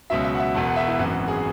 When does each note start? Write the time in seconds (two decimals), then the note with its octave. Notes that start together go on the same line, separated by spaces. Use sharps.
0.10 C#2 B2 F#3 E5
0.25 E5
0.35 F#5
0.40 E5
0.55 E1 E2 B2 F#5
0.65 F#5
0.76 E5
0.88 E4
0.99 G#1 F#2 E3 F#4
1.28 G#4